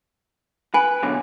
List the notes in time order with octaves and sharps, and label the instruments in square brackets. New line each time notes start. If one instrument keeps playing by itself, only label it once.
[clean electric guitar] B4 [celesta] G#5
[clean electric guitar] B2 D3 F#3